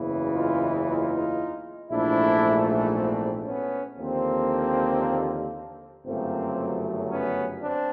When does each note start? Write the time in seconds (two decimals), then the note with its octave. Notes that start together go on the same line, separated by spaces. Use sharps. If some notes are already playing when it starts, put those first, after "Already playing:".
Already playing: F#1 E2 C#3 E3
0.34 D#4 F4
0.87 D#4 F4
1.90 A#1 G#2 E3 A3 D4 E4
2.94 C4 D4
3.46 B3 C#4
3.98 D#2 D3 F3 A#3 C4
6.06 G1 F#2 C#3 F#3 A3 A#3 C4
7.10 B3 C#4
7.62 C4 D4